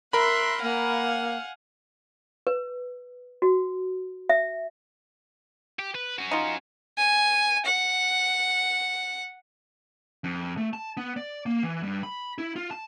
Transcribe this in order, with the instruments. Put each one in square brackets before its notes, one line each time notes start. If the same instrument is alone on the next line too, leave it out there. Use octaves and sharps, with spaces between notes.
[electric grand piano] A#4 B5 [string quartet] E5 C6 F#6
[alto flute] A#3 [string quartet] F5 F#5 G#5
[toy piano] B4
F#4
E5
[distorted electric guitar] G4
B4
C#4 F#4
[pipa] D#4 F4
[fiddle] G#5
F#5
[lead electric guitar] F2
A3
A5
B3
D5
A#3
E3
G2
B5
E4
F4
A5